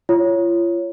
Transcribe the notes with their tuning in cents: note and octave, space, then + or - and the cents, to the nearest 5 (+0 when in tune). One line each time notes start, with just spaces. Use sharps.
F4 -35 C#5 +0